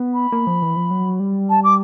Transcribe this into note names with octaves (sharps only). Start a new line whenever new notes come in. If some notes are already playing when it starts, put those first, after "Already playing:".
Already playing: B3
B5
A#3
F3
E3
F3
F#3
G3
A5
D6